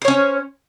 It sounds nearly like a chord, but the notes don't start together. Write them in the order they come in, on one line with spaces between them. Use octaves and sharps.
C5 C#5 C#4